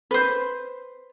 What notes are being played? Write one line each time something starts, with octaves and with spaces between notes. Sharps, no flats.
B4 C5